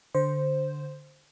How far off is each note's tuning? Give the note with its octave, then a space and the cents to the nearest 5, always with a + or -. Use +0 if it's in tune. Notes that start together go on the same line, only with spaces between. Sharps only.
D3 +0 C5 +0